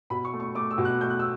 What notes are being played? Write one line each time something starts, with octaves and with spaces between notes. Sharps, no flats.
B2 B5
C#6
A3
C#6
A3 D6
E6
B2
F#6
A3 G6
F#6
E6